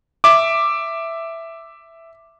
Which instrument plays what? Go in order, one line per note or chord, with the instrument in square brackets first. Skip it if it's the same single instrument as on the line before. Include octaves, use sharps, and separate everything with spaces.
[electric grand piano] E5 D6